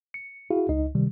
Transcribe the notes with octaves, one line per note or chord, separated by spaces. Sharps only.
C#7
E4 F#4 G#4 F5
C#2 D#4 D#5
C3 D#3 G3